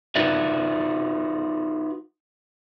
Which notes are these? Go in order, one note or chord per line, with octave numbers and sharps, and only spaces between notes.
D#4 F4 F#4 B4 D5 E5